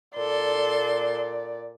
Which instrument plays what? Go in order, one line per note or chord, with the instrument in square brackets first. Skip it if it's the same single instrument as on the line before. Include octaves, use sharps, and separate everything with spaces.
[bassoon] A#2 [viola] A4 C6 [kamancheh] D5